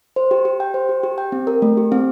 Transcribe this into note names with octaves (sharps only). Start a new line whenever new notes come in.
C5
G4
G4
G5
C5
G4
G4
G5
C4
A#4
A3
G4
C4